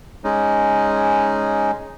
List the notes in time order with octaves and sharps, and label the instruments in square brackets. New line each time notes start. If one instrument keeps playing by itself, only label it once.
[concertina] G#3 C#4 D#4